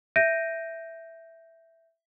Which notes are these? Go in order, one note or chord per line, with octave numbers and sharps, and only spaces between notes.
E5 G6 A#6 D7 D#7